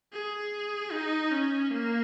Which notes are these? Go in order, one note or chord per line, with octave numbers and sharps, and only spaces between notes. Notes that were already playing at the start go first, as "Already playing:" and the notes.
G#4
D#4
C#4
A#3